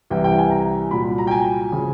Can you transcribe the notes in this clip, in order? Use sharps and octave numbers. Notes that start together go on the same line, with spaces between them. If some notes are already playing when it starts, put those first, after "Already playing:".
C2 C3 E3 G3 G5
G5
G#5
A#5
C2 A#2 F#3 B5
A#5
G5
G#5
C#3 F3